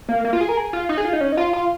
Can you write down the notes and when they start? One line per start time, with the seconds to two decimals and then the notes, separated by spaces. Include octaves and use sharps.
0.09 A#3
0.24 A#3
0.33 F4
0.41 G#4
0.49 A#4
0.57 G#4
0.73 F4
0.89 D#4
0.98 G#4
1.05 F4
1.13 D#4
1.21 C#4
1.32 D#4
1.37 F4
1.53 F4